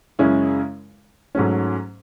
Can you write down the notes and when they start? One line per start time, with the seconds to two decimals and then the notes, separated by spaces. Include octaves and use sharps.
0.19 F#2 C#3 G#3 C#4 E4
1.35 G#2 F#3 A3 C#4